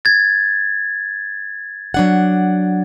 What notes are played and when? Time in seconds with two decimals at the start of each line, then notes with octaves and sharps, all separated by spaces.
0.05 G#6 A6
1.94 F#3 D4 F#5